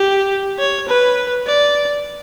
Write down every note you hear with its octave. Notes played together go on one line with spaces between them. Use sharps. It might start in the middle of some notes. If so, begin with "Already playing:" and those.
Already playing: G4
C#5
B4
D5